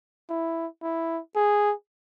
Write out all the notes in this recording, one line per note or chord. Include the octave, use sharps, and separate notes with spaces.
E4
E4
G#4